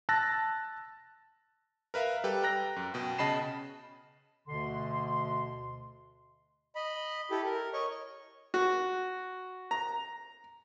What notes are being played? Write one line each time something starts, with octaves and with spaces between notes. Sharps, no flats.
A5 E6 F#6 A6 A#6
A#4 B4 E5 F5
G3 G4 A4 B4 G5
G5 A#5 F#6 A#6
F#2
B2 G5
C#3 D#5 A5 B5 C7 E7
D2 B2 D3 C6
D#5 B5
E4 G4 A4
A#4
C#5 D#5 C#6
F#4
A#5